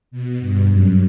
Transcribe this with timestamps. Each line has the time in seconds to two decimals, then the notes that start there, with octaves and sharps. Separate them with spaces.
0.11 B2
0.40 G2
0.69 F#2